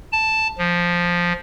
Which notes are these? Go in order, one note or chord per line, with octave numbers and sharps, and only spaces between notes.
A5
F3